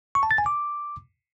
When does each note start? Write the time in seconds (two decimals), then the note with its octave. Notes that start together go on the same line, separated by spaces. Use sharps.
0.15 C#6
0.23 A5
0.31 A6
0.38 G#5
0.46 D6